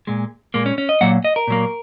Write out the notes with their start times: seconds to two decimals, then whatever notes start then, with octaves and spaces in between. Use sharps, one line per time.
0.07 A#2 G#3
0.54 A#2 G#3 A#3
0.66 C#4
0.78 C#4
0.89 D#5
1.01 A#2 F#3 A#3 F#5
1.24 D#5
1.36 A#4
1.47 A#2 F#3 A#3